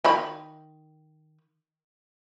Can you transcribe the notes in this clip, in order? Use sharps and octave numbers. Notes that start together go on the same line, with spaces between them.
D#3 A#5 B5